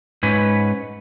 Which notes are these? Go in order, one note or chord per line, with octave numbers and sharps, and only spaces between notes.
G#2 C#4 B4